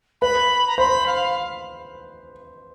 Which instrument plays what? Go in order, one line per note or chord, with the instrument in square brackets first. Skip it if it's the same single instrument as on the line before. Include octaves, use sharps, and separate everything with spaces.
[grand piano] B4 [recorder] B5
[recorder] A#5
[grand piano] C5 [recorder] B5
[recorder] F5